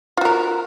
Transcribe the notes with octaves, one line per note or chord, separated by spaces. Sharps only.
F4 F#4 A#4